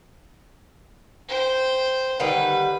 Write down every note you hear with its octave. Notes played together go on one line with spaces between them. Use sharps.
C5 G5
D3 D#3 G3 B4